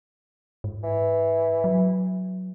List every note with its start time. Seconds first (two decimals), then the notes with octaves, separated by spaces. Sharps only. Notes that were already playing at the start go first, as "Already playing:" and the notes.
0.64 G#2
0.84 E3
1.64 F#3